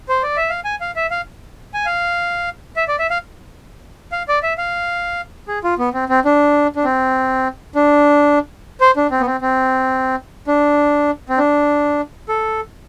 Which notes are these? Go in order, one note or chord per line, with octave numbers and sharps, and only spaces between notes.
C5
D5
E5
F5
G#5
F5
E5
F5
G#5
F5
E5
D5
E5
F5
F5
D5
E5
F5
G#4
F4
B3
C4
C4
D4
D4
C4
D4
C5
D4
C4
B3
C4
C4
D4
C4
D4
A4